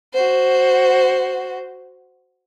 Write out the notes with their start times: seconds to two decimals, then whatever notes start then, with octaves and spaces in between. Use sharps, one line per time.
0.14 F#4 C5